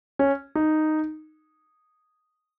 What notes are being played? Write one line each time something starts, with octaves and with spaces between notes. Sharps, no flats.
C#4
D#4